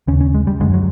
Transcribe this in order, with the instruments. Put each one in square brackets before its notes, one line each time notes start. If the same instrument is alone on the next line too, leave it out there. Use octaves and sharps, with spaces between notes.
[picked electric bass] D#2 C#3 C#4
C#4
G#3
G3
F#2 D3 G#3
F#3